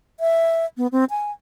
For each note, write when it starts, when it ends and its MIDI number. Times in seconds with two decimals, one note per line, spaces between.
0.20 0.65 76
0.77 0.87 59
0.92 1.04 60
1.10 1.31 80